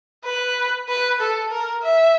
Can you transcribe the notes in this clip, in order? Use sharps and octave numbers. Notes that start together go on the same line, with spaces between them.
B4
B4
A4
A#4
E5